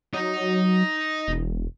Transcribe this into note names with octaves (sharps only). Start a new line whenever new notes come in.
F#3 D#4
E1